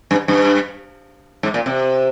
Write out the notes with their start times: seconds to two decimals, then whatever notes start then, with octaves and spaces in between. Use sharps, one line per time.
0.11 G2
0.28 G2
1.43 G#2
1.54 A#2
1.66 C3